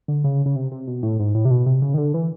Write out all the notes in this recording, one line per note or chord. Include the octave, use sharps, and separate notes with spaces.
D3
C#3
C#3
C3
C3
B2
A2
G#2
A2
C3
B2
C3
C#3
D#3
D3
E3